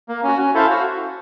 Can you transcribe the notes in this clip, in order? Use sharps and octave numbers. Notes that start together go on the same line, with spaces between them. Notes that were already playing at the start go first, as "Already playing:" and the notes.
A#3
C#4 F#4
C#4
E4 A4 C5 F5
F#4